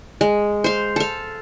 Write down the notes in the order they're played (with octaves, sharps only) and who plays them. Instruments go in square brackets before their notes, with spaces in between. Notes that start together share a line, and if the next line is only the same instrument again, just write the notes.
[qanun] G#3
C5 F5
A4 F5